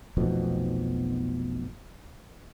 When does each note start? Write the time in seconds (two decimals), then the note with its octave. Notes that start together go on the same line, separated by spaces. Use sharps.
0.17 F1 B1 F2 B2